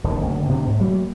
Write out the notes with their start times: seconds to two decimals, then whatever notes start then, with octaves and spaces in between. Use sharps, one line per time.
0.04 D#1 D2 D#3
0.21 F#1 D2
0.49 B2 D4
0.65 D2 G#2
0.80 F#3 G3 A3 A#3